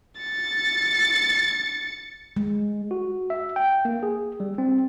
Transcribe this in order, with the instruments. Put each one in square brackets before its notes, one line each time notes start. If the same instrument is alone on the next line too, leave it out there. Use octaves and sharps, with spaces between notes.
[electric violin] A6 C#7
[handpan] G#3
[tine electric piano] F#4
E5
G5
A#3
G#4
G3
C4